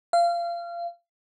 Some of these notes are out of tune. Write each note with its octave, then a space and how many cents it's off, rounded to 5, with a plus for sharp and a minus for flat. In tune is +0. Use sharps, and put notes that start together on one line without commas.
F5 -25